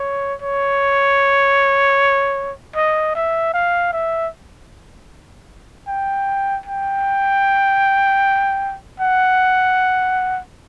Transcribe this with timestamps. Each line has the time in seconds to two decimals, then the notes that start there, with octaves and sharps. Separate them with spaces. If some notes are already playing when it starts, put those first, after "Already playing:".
Already playing: C#5
0.42 C#5
2.76 D#5
3.15 E5
3.54 F5
3.93 E5
5.88 G5
6.66 G5
9.00 F#5